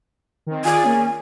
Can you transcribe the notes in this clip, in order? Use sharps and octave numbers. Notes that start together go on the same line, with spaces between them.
D#3 C4
F4 G#4 D5 G#5
A#3 C#4